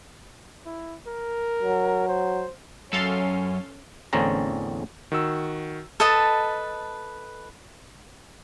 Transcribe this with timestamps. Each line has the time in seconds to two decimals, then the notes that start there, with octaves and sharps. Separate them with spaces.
0.66 E4
1.07 A#4
1.63 F#3
2.09 C5
2.93 F#2 C#4 A4 F5 C6
4.13 A1 E2 D3 C4 C#4 A#5
5.12 D#3 F#4 E6
6.00 A4 B4 D#5 A5